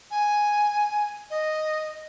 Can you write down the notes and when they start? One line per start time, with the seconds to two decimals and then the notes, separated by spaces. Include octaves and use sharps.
0.11 G#5
1.31 D#5